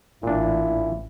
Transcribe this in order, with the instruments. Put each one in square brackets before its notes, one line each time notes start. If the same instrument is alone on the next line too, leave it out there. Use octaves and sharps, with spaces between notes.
[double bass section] A1 [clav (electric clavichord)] A#2 D4 [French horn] E4